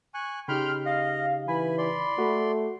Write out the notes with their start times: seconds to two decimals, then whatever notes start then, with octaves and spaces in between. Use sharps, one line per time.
0.14 G#5 C#6 F#6
0.48 C#3 D#4 G4 G5 B5 C6 F6
0.85 D#5 F5
1.48 E3 G#5 B5
1.78 D5 C6
2.18 A3 F#4